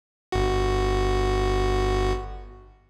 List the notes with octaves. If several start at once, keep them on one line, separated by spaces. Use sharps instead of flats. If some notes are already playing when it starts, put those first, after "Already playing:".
G1 F#4